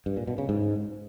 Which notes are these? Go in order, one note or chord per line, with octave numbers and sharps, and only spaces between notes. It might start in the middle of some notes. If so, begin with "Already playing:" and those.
G2
A#2
B2
C#3
G#2